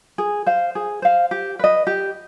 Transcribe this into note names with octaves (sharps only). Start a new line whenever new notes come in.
G#4
C5 F5
G#4
C5 F5
G4
B4 D#5
G4